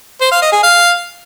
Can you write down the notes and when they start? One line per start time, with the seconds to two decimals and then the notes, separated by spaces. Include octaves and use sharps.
0.21 C5
0.31 F5
0.42 D#5
0.52 G#4
0.63 F5